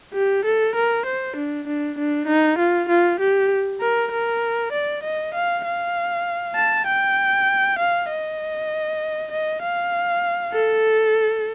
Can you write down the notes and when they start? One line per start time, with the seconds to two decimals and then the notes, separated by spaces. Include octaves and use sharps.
0.14 G4
0.45 A4
0.75 A#4
1.06 C5
1.36 D4
1.67 D4
1.98 D4
2.27 D#4
2.58 F4
2.89 F4
3.20 G4
3.81 A#4
4.12 A#4
4.72 D5
5.03 D#5
5.34 F5
5.65 F5
6.55 A5
6.86 G5
7.78 F5
8.09 D#5
9.31 D#5
9.62 F5
10.53 A4